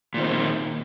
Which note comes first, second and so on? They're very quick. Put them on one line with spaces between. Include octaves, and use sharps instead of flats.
A#2 D#3 C4